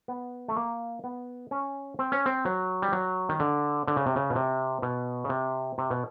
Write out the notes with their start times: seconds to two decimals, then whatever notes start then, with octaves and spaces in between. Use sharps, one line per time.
0.08 B3
0.48 A3
0.56 A#3
1.04 B3
1.51 C#4
1.99 C4
2.12 C#4
2.26 C4
2.45 F#3
2.82 G3
2.92 F#3
3.29 D#3
3.40 D3
3.87 D3
3.96 C#3
4.06 C3
4.16 C#3
4.30 B2
4.36 C3
4.82 B2
5.24 C#3
5.29 C3
5.78 C3
5.90 B2